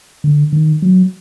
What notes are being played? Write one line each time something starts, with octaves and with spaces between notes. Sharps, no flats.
D3
D#3
F#3